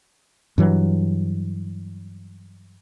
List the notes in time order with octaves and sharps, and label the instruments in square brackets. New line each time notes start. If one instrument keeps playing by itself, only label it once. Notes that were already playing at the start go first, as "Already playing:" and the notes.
[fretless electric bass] G2 E3 F#3